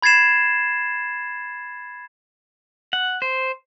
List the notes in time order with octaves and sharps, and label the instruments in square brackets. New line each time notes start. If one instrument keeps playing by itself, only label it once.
[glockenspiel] B5 G#6 A6 C7 E7
[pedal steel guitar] F#5
C5